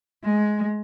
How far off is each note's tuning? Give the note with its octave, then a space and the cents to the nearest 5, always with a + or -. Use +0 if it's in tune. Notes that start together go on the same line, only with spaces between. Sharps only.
G#3 +15